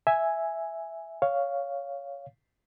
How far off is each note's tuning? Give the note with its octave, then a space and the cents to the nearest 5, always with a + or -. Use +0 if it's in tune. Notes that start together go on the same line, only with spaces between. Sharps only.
E5 +0 G#5 +0
C#5 +10 F5 +0